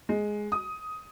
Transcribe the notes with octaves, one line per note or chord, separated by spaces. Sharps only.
G#3
D#6